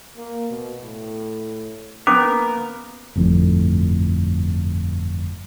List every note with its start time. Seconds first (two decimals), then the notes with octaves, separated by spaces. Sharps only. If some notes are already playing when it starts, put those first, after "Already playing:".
0.17 A#3
0.50 B2
0.82 A2
2.07 A#3 B3 C#4 A#4 D6
3.16 G1 F2 A2